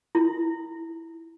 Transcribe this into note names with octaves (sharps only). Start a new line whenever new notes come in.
E4